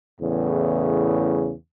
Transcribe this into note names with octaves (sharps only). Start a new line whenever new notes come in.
E2 A2 C#3